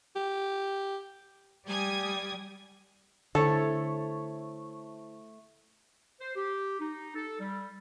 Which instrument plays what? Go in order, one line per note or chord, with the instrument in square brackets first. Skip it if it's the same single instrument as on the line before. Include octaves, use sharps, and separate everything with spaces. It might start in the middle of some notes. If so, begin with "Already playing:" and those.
[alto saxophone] G4
[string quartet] G3 [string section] G#5 D#6 G#6
[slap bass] D3 [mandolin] A3 C#5 [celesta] E4 C5 [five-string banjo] A4
[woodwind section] C5
G4
D#4
A4
G3